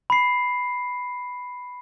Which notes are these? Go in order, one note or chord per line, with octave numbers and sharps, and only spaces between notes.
B5 C7